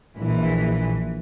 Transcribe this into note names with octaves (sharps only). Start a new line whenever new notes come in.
A#1 E3